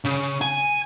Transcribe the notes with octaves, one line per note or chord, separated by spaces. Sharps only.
C#3
G#5